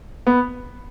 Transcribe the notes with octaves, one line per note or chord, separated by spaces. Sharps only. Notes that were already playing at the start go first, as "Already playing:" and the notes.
B3